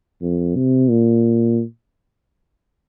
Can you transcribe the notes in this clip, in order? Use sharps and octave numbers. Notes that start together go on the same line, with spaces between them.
F2
C3
A#2